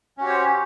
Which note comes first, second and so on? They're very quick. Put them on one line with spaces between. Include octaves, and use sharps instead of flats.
C#4 F#4 G4 C#5 C5